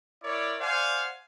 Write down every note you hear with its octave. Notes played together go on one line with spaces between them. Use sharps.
E4 A#4 C#5 D5
C5 D5 F5 F#5 G#5